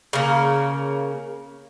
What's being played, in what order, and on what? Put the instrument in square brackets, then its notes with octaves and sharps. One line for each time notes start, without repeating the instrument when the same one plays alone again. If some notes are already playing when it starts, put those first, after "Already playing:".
[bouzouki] C#3 A#3